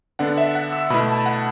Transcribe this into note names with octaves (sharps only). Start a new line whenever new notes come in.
D3 B3 D4 F#5
E5
F#5
E6
B2 A3 E4 B5
A5
F#5